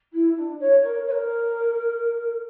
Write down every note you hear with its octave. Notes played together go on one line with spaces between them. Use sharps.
E4
D4
C#5
A#4
C#5
A#4